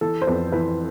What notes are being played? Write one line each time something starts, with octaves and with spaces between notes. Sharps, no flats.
E3 A4
C5
F2 B4
E3 B4